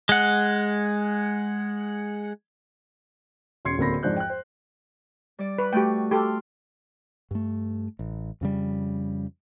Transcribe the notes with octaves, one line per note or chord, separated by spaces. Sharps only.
G#3 F#5
E1 C#4 C6 G#6 C7 C#7
D1 D3 A#3 C4 B5 A#6
F2 G#2 D4 C5 F#6 G6
G5 F#6
C5
G3 D5
B4
A3 F#4 G4 G5
G4 A4 C6 D6 F6
G2 A3
A1
F2 C#3 G3